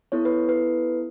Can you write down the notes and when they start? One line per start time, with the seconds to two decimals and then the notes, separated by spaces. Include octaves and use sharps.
0.12 B3 E4 A4 C#5
0.25 B4
0.49 B4